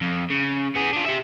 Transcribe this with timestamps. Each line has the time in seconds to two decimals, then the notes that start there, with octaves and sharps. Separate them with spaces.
0.02 F2
0.30 C#3
0.76 B3 G#4
0.93 D4 F4
1.06 G4 E5